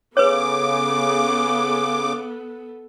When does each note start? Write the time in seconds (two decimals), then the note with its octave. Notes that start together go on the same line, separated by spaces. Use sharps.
0.17 C#3 B3 A4 B4 C#5 D6